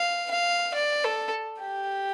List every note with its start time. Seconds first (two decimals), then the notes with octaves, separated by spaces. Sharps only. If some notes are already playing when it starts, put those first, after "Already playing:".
Already playing: F5
0.31 F5
0.75 D5
1.04 A4
1.62 G4